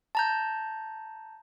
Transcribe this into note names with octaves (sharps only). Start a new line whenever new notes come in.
A5 A#5 G6